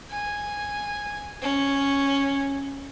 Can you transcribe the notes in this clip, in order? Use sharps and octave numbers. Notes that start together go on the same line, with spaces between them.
G#5
C#4